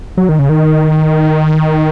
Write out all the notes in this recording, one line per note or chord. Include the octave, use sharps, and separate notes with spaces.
F#3
D#3
C#3
D#3